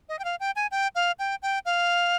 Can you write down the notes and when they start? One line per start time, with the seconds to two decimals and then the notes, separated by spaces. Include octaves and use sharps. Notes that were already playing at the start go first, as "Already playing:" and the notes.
0.09 D#5
0.19 G5
0.24 F5
0.40 G5
0.56 G#5
0.71 G5
0.95 F5
1.19 G5
1.42 G5
1.65 F5